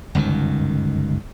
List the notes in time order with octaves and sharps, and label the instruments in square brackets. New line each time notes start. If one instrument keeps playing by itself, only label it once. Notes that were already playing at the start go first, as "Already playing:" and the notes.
[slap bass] G1 C#2 F#2 D#3